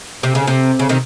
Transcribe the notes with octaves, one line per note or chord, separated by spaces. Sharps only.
C3
C#3
C3
C#3
C3 D#3